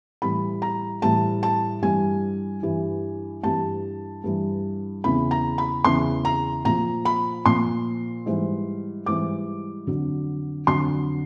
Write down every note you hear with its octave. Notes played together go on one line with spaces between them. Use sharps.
A2 E3 G3 B5
A#5
A2 E3 G3 A5
A5
G2 E3 G3 G#5
G2 E3 G3
G2 E3 G3 A5
G2 E3 G3
E2 C#3 E3 B5
A#5
B5
E2 C#3 E3 C6
A#5
A#2 F3 A#5
B5
A#2 F3 C6
G#2 E3 G3
G#2 E3 G3 D6
F2 D3 F#3
F2 D3 F#3 C6